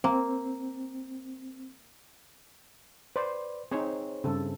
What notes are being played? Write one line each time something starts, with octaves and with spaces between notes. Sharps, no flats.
A#3 C4
B4 C5 D5
C4 D#4 G#4 C5 C#5
G2 C#3 C4 A4